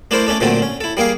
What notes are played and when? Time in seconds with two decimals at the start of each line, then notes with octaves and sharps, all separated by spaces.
0.11 A3 D4 E4 A4 A#4 C5
0.26 A3 C#4 D4 A4
0.40 A#2 D3 F#3 A3 C4 A4
0.62 C#4
0.81 E4 A4
0.97 G3 A#3 G#4 F5